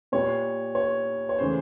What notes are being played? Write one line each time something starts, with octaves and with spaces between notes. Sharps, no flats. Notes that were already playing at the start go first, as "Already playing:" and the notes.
A#2 G3 C#5
C#5
C#5
C#3 E3 A3 C5